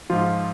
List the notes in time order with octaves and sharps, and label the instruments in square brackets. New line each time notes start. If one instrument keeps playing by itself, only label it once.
[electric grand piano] G#2 F3 F4